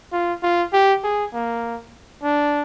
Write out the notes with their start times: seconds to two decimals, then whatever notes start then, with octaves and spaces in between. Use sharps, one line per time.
0.12 F4
0.43 F4
0.73 G4
1.04 G#4
1.34 A#3
2.23 D4